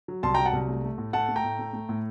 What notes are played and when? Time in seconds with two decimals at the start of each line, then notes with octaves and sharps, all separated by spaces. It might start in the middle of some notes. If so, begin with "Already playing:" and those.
0.08 F#3
0.23 C2 A5 C6
0.34 F#3 G5 A#5
0.45 F#5 A5
0.53 C2
0.68 A3
0.84 A3
0.98 A2
1.13 A3 F#5 A5
1.29 A3
1.36 G5 A#5
1.44 A2
1.59 A3
1.73 A3
1.89 A2